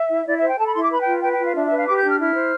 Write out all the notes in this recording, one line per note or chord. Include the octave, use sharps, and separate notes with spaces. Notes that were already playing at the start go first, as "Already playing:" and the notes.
Already playing: E5
E4
E4 D5
E5
C5
G5
A4 A5
B5
E4 C6
D6
B4 B5
G5
F4
B4 G5
G5
F4
F5
D4 E5
B4 E5
F5
G4 D6
G6
D4
F6
E4 F6
C5